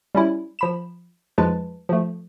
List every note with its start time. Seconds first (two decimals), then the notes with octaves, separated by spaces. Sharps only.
0.15 G3 C#4 E4
0.59 F3 B5 E7
1.38 F2 F3 G#3 D#4 B4 A5
1.89 F3 A3